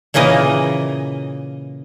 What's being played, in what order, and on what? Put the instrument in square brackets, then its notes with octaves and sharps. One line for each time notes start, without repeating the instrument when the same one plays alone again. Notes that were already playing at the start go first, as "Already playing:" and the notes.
[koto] A#2 C#3 E3 A#3 D#5